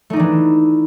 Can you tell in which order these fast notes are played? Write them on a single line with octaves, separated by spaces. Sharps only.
A3 D#4 D4 E3